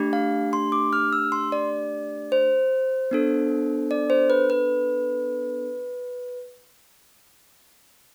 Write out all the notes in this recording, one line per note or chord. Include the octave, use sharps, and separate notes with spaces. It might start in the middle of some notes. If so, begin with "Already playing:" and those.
Already playing: A3 D4 G4
F5
C6
D6
F6
E6
C6
D5
C5
B3 D4 A4
D5
C5
B4
B4